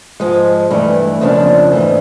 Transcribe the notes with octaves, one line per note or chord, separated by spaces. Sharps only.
G#2 F3 G#3
G2 E3 A3
F2 C#3 F3 A#3 D4
G#2 E3 A3